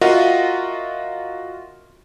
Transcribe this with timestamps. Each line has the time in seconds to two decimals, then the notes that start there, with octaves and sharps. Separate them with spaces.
0.01 F4 F#4 A#4 D#5 E5 F#5